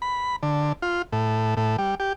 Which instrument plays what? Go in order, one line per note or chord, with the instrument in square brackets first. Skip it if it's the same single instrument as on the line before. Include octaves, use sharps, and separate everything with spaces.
[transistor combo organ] B5
D3
F4
A2
A2
G3
G4